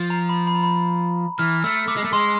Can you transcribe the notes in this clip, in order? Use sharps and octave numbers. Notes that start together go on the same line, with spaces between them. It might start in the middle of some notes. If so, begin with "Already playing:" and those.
Already playing: F3
A#5
B5
B5
A#5
B5
E3 F6
A3 E6
A3 D6
G#3
A3
G#3 C6